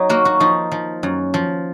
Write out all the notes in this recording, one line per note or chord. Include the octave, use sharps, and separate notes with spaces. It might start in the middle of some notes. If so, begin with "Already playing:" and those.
Already playing: F#3 D#4
A#3 F#4
F#4
F3 D#4
F3
F#2
F3